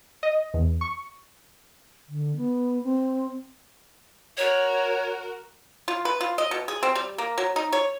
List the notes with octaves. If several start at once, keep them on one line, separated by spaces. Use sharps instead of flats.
D#5
E2
C#6
D3
B3
C4
F#4 A#4 C#5
F4
B4
F4
D#5
B2
G#4
C4
G3
A#3
F#3
D#4
C#5